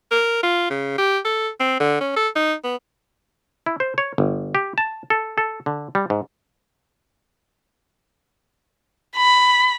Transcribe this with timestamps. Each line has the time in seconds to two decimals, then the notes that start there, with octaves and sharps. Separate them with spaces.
0.11 A#4
0.43 F4
0.70 C#3
0.98 G4
1.25 A4
1.60 C4
1.80 D3
2.00 C#4
2.16 A4
2.36 D#4
2.64 B3
3.66 E4
3.80 C5
3.98 C#5
4.18 G1
4.55 G4
4.78 A5
5.10 A4
5.38 A4
5.66 D3
5.95 G3
6.10 G#2
9.17 B5